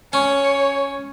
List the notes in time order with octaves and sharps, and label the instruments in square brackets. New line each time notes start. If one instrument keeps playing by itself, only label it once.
[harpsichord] C#4 [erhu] C#5